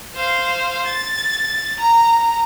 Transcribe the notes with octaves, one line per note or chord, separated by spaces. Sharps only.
C5 F5
A6
A#5